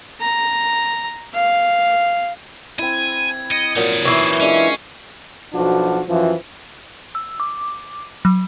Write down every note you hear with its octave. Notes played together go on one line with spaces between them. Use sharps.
A#5
F5
C4 E4 G#5 G#6
D#5 G#6 C#7
A#2 F#3 C#4 D#4
E3 E4 C#6 C7
G#3 C#4 D4 F4
B1 F3 D4 F#4
F#2 E3 F3
E6
D6
F#3